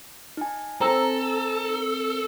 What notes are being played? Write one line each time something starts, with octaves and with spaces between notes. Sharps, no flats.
D#4 G#5
C4 A4 A#5 E6